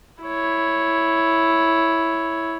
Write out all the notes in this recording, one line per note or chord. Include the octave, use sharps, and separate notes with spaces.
E4 C#5